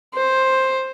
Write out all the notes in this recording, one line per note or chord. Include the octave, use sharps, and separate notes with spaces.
C5